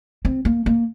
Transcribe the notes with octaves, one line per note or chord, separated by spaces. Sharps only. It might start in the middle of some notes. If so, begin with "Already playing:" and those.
C4
A#3
A#3